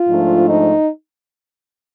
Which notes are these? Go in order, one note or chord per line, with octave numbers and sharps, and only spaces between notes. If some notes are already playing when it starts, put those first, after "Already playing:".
Already playing: F4
G#2 F3 A3 D4
D#4